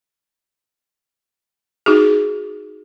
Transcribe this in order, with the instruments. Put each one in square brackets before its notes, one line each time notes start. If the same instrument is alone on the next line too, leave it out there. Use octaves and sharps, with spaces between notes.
[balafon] D#4 F#4 G#4